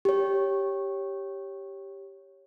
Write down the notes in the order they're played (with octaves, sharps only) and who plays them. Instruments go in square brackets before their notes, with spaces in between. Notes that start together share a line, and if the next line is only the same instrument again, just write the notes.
[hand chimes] G4 C#5